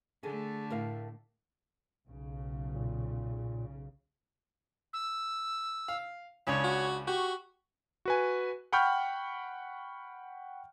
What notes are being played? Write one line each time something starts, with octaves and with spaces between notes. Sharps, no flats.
D3 A3 G#4 A4 G#5
A2 A#4 F5
B1 C#3
A#2
E6
F5
C#2 C#3 D4 C#5
F#4
F#4 G4 C#6
F#4 B4 G#5
F#5 G5 B5 C#6 F6 G6